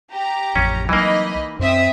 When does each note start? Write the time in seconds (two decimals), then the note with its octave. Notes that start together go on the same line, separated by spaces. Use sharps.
0.11 G4 A#5
0.56 A1 F2 C#4
0.89 C2 E3 F#3 A#3 D#4 D#5 B5
1.59 F#2 C4 E5 D#6